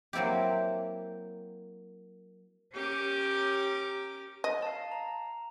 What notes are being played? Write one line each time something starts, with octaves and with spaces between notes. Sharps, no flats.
F#3 A#3 C4 E4 G4
C#4 G4 A#4 D6
D#5
F5 A5
A#5